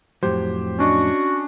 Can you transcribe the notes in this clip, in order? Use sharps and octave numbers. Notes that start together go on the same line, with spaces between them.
F2 A2 F#3 G4 C5
C#4 D4 F#4 D#5 C#6